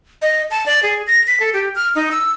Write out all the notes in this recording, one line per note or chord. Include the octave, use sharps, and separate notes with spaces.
D#5
A5
D5
G#4
A#6
B6
A4
G4
F6
D#4
E6